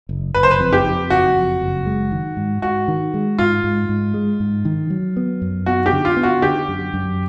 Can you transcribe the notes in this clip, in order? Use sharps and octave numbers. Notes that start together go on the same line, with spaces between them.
F#1
F#1 B4
C5
B4
F2
G4
F2
F#1 F#4
F2
F#1
G#3
D#3
G#2
G#2 F#4
D#3
G#3
G#2 F4
G#2
G#2
G#3
G#2
D#3
F#3
B3
F#2
B3 F#4
G4
D3
F4
B3
F#4
D3 G4
F#2
F#2